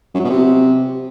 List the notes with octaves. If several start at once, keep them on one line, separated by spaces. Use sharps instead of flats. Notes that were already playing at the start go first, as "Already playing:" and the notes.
F#2
F#3
B2
C3